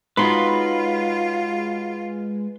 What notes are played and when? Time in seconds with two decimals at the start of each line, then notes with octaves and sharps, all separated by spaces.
0.17 G#3 D#4 F4 F#4 B4 C#5 B5 C6